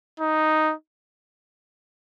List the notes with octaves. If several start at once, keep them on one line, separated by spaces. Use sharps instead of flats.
D#4